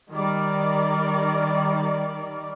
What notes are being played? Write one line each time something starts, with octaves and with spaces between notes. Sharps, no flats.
D#3 G3 A#4 D5